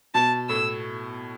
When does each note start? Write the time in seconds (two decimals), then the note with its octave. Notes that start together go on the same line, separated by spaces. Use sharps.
0.14 B2 A5
0.49 A2 E6